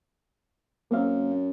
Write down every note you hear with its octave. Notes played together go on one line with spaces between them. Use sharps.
F#2 A#3 C4 F5